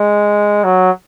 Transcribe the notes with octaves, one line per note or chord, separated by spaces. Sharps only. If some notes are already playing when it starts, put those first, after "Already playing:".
Already playing: G#3
F#3